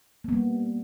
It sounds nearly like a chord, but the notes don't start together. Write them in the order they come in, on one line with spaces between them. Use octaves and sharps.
A#3 B3 G3